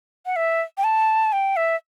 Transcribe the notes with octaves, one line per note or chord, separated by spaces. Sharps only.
F#5
E5
G5
A5
G5
E5